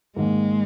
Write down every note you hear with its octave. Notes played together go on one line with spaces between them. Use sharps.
G#2 D#3 G#3 A#3